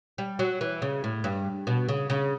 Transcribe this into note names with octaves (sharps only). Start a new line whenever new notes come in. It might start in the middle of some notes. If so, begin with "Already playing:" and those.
G3
F#3
E3
C#3
A2
G2
B2
C#3
C#3